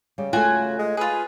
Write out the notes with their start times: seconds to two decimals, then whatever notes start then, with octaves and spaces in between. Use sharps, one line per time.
0.18 C#3 G3
0.33 A3 F4 F#4 G#5
0.79 G#3
0.97 F4 G#4 B4